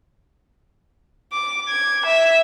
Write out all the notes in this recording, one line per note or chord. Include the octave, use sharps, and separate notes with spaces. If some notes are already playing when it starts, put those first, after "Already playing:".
D6
G#6
E5